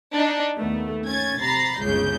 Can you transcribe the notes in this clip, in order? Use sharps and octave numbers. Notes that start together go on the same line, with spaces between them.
D4 D#4
D#2 A3 B3
C#4 G#6 A6
C3 A#5 B5 A6 C7
G1 C#2 C#3 G6